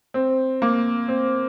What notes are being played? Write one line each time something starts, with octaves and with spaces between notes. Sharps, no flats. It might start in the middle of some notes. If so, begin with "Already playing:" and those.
C4
A#3
C4